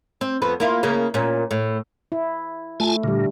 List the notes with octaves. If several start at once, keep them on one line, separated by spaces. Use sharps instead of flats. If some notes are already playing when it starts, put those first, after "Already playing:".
C4
F2 B3 B4
A#3 E4 F4
C#3 A#3
A#2 C#4
A2
E4
A3 F4 G#5 A5
A#2 D3 G3